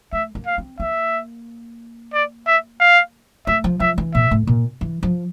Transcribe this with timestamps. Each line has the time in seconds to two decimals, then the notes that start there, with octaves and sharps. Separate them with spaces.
0.13 A3 E5
0.35 A#3
0.46 F5
0.58 C4
0.80 A#3 E5
2.13 D5
2.47 E5
2.80 F5
3.47 A3 E5
3.64 F3
3.80 F3 E5
3.98 E3
4.14 A#2 E5
4.31 A2
4.47 A#2
4.81 E3
5.03 F3